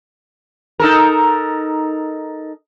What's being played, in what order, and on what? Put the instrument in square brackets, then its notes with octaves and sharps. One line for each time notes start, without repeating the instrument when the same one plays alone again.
[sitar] D#4 A4 A#4